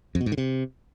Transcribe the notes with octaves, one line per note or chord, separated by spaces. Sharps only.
F2
B2
G#2
D3
C3